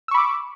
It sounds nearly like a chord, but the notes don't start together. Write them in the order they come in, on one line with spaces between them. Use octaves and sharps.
E6 C#6 B5 D6